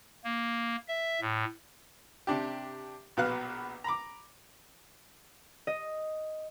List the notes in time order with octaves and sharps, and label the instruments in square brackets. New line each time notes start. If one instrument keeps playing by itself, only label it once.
[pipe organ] A#3
E5
A2
[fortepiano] C3 D4 G4
A#1 B2 B4 F5 F#6
A#5 B5 D6
[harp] D#5